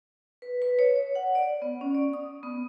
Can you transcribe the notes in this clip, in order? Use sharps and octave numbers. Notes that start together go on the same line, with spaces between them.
B4
B4
C#5
C#5
F#5
D5
B3
C#4
D5
D#6
B3